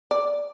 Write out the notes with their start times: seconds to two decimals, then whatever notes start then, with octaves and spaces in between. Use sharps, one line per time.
0.11 D5